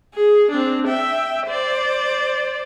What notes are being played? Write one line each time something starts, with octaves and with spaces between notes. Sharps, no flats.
G#4
C4 D4
E5 G5
C5 D5